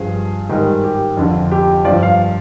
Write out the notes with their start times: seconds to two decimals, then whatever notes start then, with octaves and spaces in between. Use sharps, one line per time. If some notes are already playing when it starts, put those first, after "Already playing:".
Already playing: G2 F3 G#4
0.49 G#2 D#3 G3
0.84 G4
1.17 F2 D3 F3
1.52 G4
1.85 F3 D5
1.88 G2
2.03 F5